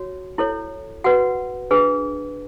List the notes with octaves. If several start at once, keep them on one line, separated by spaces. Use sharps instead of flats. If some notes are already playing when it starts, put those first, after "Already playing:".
Already playing: F#4 C#5
E4 A4 C#5
F#4 B4 F#5
D4 G#4 B4